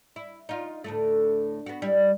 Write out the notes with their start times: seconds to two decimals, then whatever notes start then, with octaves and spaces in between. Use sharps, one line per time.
0.16 E4
0.49 D#4 F4
0.84 D2 A2 A3
1.66 B3 F#4
1.82 G3 E4